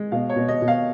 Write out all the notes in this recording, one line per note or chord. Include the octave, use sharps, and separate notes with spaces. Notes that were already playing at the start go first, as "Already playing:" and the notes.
Already playing: G#3
B2 F5
C#5
B2
D#5
B2
F5